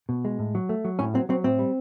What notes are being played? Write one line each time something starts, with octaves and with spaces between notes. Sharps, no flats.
B2
G#3
A2
F#3
A3
F#3
A2 C#4
F#3 C4
F#3 C4
A2 C4
G3